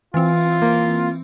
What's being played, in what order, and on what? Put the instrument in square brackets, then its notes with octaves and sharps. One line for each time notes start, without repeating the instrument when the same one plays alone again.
[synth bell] E3 C4 [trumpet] F4
[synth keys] A#3